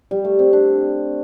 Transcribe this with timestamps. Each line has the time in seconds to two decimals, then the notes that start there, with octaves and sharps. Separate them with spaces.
0.11 G3
0.24 A3
0.39 C4
0.53 D4